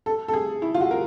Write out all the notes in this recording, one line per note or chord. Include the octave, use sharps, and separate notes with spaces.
A4
A4
G#4
E4
F4
F#4
A#4